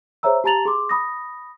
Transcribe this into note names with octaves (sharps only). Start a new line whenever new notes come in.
G#4 C5 C#5 E5 A#5 E6
G4 A5 A#5 A6 F7 F#7
G#4 C6 D6
B5 D#6 A#6